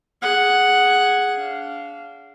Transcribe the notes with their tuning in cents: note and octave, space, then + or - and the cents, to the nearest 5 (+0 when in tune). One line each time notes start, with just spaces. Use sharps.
G#4 +0 F#5 +0
D4 -30 F5 -15